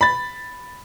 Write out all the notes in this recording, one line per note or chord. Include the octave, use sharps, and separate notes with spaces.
B5 A6